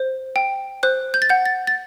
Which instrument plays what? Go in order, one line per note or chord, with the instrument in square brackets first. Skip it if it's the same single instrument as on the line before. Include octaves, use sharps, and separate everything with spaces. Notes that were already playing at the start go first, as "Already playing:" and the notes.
Already playing: [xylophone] C5
G5
C5 F#6
G6
A6
F#5 G6
A6
A6